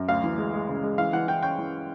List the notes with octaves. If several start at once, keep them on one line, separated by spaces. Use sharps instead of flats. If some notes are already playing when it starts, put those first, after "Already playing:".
Already playing: F#2
D2 F5
E3
G#3
G#3
C#3
G#3
E3 F5
E3 F#5
E3 G5
C#4 G5
E3